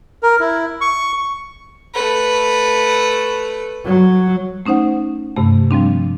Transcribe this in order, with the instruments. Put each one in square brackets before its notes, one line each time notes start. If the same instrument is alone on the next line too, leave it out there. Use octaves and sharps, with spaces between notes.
[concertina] A#4
E4
C#6
[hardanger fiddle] A3 B4
[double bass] F#3
[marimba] A3 C#4 D#4 C5 F#5
G2 C3 A3
F3 G3 C4 D4